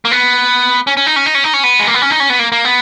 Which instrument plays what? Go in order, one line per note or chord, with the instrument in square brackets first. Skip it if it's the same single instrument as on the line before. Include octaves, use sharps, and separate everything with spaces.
[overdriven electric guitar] A#3
B3
C#4
C#4
D#4
C#4
D#4
C#4
D#4
C#4
B3
G#3
A#3
B3
C#4
D#4
C#4
B3
A#3
A#3
B3